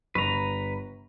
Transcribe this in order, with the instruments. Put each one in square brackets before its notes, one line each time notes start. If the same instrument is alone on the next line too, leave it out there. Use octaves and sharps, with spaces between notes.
[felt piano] G1 C#6 [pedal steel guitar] B4 A#5